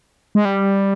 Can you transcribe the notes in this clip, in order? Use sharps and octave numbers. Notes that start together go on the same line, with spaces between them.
G#3
G3